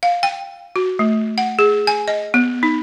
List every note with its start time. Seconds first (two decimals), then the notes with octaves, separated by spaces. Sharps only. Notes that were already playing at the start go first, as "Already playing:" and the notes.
0.03 F5
0.23 G5
0.76 F#4
0.99 A3
1.38 F#5
1.59 G#4
1.87 G#5
2.08 D#5
2.34 B3
2.63 D#4